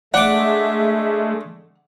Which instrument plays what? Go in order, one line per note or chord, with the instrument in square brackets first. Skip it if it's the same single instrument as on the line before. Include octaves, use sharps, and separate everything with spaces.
[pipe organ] G#3 A3 [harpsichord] D4 D6 [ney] E5 [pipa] F#5